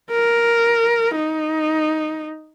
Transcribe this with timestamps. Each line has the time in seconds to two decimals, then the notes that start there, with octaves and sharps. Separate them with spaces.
0.11 A#4
1.16 D#4